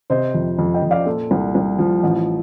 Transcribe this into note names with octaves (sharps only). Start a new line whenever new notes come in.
C3 C5 D#5
F2
F2
D#5 G5
F2
D5 F5
A#2 F4 A4
C2
C2
F3
A1